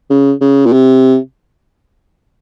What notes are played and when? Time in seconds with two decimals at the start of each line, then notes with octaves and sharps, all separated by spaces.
0.10 C#3
0.41 C#3
0.66 A#2
0.73 C3